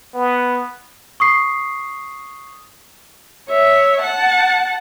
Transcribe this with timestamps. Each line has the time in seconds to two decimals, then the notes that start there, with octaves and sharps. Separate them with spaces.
0.14 B3
1.20 C#6 D#6 C7
3.49 C#5 E5
4.02 F#5 A5